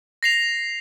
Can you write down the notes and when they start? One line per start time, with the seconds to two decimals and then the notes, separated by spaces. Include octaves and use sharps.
0.23 A#6 C7 F7